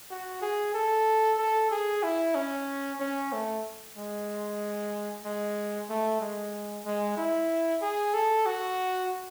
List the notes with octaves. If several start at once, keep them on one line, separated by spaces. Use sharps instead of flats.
F#4
G#4
A4
A4
G#4
E4
C#4
C#4
A3
G#3
G#3
A3
G#3
G#3
E4
G#4
A4
F#4